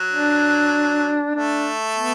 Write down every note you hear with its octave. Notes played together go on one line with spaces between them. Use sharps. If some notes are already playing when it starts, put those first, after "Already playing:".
Already playing: F#3
D4
A3 D4
B3